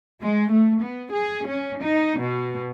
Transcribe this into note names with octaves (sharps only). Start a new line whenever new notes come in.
G#3
A3
B3
G#4
C#4
D#4
B2